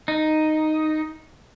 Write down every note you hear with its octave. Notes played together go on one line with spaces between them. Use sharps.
D#4